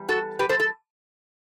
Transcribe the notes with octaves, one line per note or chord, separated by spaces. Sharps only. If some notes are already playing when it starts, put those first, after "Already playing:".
Already playing: E2 G3
F#4 A4
G4 B4
A4 C5
A4